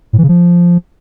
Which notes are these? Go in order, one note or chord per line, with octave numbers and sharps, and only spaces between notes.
A2
E3
C#3
F3